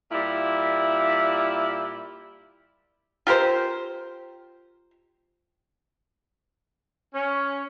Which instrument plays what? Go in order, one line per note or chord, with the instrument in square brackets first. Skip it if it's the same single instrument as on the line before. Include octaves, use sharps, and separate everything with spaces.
[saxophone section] A#2 G3 E4
[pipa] F4 G4 A#4 C5
[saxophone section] C#4